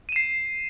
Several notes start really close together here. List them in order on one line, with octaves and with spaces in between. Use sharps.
D#7 E7 C7